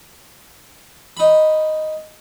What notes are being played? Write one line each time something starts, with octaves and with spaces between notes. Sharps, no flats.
D#4 B5